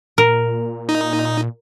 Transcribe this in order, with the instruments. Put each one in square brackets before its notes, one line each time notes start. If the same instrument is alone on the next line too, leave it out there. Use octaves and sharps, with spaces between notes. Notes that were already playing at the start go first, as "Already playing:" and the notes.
[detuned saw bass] A#2 [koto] A#4
[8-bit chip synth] D#4